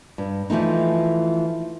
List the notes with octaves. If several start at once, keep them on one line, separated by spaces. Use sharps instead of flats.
G2
E3 F3 A3 D#4